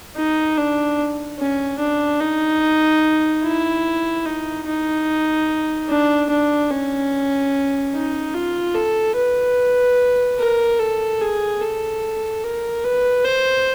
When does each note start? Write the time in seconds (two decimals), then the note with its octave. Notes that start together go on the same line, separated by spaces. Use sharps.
0.16 D#4
0.57 D4
1.39 C#4
1.79 D4
2.21 D#4
3.43 E4
4.25 D#4
4.67 D#4
5.89 D4
6.30 D4
6.70 C#4
7.94 D#4
8.34 F4
8.75 A4
9.16 B4
10.39 A#4
10.79 A4
11.21 G#4
11.61 A4
12.44 A#4
12.84 B4
13.25 C5